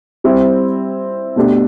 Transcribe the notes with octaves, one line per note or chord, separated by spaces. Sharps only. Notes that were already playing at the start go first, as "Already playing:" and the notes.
G3 C4 E4
B2 A3 D4 G4